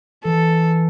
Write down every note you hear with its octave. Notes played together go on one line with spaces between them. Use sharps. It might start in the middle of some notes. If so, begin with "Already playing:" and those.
E3 A4